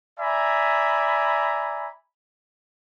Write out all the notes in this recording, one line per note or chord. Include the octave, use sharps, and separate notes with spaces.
D5 E5 G#5 A#5 B5